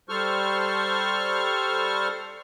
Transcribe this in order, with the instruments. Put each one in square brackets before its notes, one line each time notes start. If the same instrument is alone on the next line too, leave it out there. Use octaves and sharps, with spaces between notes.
[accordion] G3 A4 C5 C#6 F6